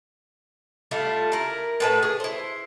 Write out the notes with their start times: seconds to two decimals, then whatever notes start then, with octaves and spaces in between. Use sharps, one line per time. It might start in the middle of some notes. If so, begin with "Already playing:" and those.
0.91 G3 A3 E4 F4
1.32 E4 A#4
1.80 A2 B4 A5
2.03 G#4
2.20 E4 C5